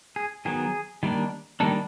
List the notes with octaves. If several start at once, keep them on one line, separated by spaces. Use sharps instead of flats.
G#4
D#3 F#3 B3 G#4
D#3 G3 A#3 D4
D#3 G3 A#3 D4 A4